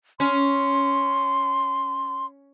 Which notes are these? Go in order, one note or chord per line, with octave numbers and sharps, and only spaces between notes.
C#4 C6